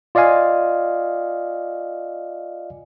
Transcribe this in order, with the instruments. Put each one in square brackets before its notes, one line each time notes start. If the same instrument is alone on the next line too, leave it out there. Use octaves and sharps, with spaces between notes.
[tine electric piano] F4 D5 D#5 F5 G#5